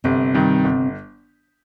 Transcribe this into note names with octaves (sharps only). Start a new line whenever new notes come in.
G1 C3 C4
G2 D#3
G1